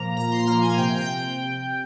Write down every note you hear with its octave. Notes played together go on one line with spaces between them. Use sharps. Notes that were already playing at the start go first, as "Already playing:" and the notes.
Already playing: A#2 F3 A#3 A#5
A#2 A#5
C6
F3 A#3 A#5
G#5
C3 G5
G5